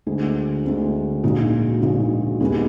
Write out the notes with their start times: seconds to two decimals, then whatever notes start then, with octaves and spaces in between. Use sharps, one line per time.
0.06 D2 D3 G#3
0.65 D2 D3 G#3
1.23 A#1 A#2 G#3 D#4 F#4
1.82 A#1 A#2 G#3 D#4 F#4
2.40 D#2 D#3 G#3 B3